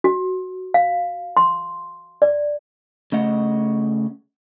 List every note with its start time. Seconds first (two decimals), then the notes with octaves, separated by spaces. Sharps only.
0.04 F#4
0.74 F5
1.37 C6
2.22 D5
3.12 C#3 A3 D#5 F#5